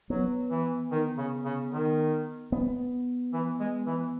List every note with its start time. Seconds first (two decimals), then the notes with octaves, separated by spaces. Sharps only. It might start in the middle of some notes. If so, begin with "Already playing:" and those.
0.10 F#3 B3
0.50 E3
0.91 D#3
1.18 C#3
1.45 C#3
1.71 D#3
2.52 B3
3.33 E3
3.60 G#3
3.86 E3